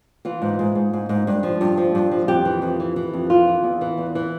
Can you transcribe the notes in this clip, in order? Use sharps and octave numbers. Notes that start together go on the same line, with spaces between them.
E3 F4
G#2
G#2
G#2
G#2
G#2
G2
F3
G2
F3
G2
F3
F2 G4
E3
F2
E3
E3
F2
E3 F4
E3
E2
E3
E2
E3